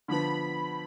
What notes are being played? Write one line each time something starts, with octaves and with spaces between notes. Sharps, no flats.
D3 F3 B3 B5